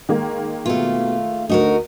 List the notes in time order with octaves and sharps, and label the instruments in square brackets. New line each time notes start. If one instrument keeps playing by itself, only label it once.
[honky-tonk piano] D#3 G#3 A#3
[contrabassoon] B2 [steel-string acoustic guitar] A3 F4
[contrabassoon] D2 [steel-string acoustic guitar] D#4 F#4 A#4